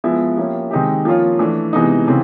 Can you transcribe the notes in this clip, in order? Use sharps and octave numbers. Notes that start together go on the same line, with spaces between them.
F3 G#3 B3 E4
F3 A#3 C#4 E4 G4
D#3 G#3 C4 D#4 G4
F3 A#3 C#4 F4
E3 A3 D4
C3 E3 G#3 B3 D#4
C#3 E3 C4